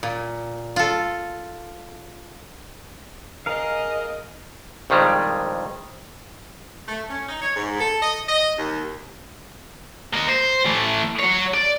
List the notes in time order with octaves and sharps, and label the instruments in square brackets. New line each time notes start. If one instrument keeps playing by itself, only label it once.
[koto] A#2
F4 A4
[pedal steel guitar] G#4 A#4 F5 [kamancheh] D#5
[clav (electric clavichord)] A#1 F2 D#3 G3 G#3
[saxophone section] A3
C#4
D#4
C#5
G#2
A4
D#5
D#5
D#2
[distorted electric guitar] A#3 D#5
C5
E3 A3
F#3 C#5
D5